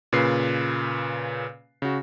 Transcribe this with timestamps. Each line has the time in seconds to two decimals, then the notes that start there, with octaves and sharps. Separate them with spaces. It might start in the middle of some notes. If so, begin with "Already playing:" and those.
0.13 A#2 C#3 B4 C7
1.82 C#3 F#4